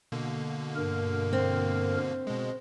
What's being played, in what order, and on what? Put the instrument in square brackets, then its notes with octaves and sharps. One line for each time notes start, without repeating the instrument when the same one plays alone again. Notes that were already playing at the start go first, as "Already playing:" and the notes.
[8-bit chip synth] B2 D3 A#3
[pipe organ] G2 A#4
[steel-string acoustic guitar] C4
[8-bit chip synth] B2 G#3